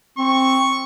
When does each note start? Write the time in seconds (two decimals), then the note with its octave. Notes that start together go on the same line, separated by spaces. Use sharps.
0.18 C4 C#6